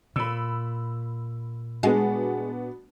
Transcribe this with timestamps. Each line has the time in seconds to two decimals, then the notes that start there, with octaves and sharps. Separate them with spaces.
0.16 A#2 B5 E6
1.83 G#3 B3 D4 F#4